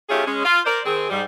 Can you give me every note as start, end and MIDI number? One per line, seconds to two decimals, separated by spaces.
0.09 0.25 57
0.09 0.25 61
0.09 0.25 63
0.09 0.25 65
0.09 0.25 67
0.09 0.25 68
0.26 0.41 56
0.26 0.41 61
0.45 0.60 65
0.65 0.80 70
0.65 0.80 72
0.65 0.80 74
0.86 1.06 51
0.86 1.06 60
0.86 1.06 68
1.09 1.23 44
1.09 1.23 55